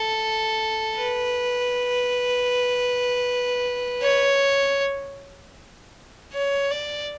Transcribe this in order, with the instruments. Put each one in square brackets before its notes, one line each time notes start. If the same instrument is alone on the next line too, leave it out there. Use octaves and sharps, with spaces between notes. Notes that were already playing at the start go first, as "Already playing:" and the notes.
Already playing: [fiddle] A4
B4
C#5
C#5
D5